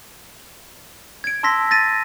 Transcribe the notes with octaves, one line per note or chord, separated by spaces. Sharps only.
G#6 D7
A5 C6 E6 A#6 B6
A6 A#6 D#7